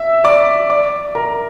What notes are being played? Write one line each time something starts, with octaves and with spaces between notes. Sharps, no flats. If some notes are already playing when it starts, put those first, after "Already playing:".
Already playing: E5 E6
D5 D6
D5 D6
A#4 A#5